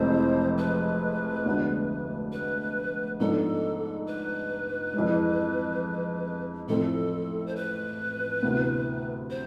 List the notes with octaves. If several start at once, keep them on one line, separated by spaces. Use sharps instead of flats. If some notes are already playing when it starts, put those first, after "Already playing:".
Already playing: F1 F2 E3 G#3 C4 C5
B4
D2 D3 G#3 B3 D4
B4
G#2 F3 B3 D4 A4
B4
F2 E3 G#3
A1 A2 F3 A3 C4 A4
C5
B4
D2 C3 E3 B3
C5